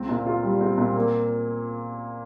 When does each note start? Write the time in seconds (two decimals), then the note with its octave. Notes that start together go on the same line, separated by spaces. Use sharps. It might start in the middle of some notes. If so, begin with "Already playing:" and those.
Already playing: C#2 C4
0.09 A#2
0.26 F4
0.43 G3
0.61 C4
0.78 A#2
0.95 A#3